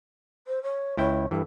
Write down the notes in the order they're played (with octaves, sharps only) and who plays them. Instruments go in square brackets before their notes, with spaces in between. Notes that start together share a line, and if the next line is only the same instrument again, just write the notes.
[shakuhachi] C5
C#5
[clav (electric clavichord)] C#2 E4 G5 [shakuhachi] C#5
[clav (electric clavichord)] G2 E3 [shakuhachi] A4